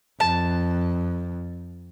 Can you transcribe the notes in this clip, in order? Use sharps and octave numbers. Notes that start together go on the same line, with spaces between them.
F2 A5